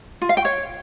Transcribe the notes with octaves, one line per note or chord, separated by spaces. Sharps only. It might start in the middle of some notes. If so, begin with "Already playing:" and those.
F4
F5
G5
C#5